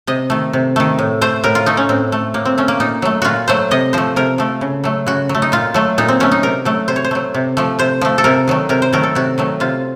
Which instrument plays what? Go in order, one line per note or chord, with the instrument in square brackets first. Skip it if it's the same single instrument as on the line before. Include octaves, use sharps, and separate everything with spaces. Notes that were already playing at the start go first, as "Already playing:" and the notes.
[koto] C3 D#5
D#3 A3
C3
D#3 A3
A2
A3 C5
A2 A#4
F4
A3 D#4
C#4
A2 C4
A3
A2 A#3
C4
A3 C#4
A#3
A#2 D#4
F#3 A3
A#2 F4 F#4
F#3 A3 C5
C3 D#5
F3 A3 C5
C3 A#4
F3 A3
C#3
F#3 A3
C#3 F#4
F#3
A3
D#4
A#2 F4
F#3 A3
A#2 D#4
C4
F#3 A3 C#4
D#4
C3 A#4
F#3 A3
C3 C5
C#5
C5
F#3 A3
C3
F3 A3
C3 C5
F3 A3
A4
C3 A#4
D#3 F#3 A3
C3 A#4
C5
D#3 F#3 A3 A#4
A4
C3 F#4
D#3 F#3 A3
C3 F4